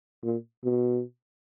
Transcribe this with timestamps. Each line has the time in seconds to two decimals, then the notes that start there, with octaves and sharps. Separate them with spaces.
0.23 A#2
0.64 B2